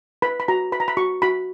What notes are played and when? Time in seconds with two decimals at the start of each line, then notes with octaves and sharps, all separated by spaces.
0.22 B4 B5
0.40 B5
0.48 F#4 A#5
0.72 B4 B5
0.80 A#5
0.88 B5
0.97 F#4 C#6
1.22 F#4 B5